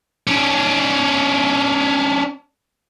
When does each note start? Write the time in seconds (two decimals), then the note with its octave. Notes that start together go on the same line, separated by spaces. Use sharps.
0.27 C#4 D4